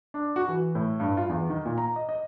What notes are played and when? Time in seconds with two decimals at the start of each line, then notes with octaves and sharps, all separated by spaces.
0.14 D4
0.36 F#4
0.48 E3
0.75 A2
1.00 G2
1.17 F4
1.29 E2
1.50 D#3
1.65 A#2
1.78 A#5
1.96 D#5
2.09 D#5